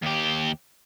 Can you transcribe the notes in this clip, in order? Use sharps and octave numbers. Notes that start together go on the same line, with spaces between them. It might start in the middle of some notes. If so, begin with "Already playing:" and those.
D#2 G4